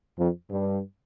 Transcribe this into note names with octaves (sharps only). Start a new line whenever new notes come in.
F2
G2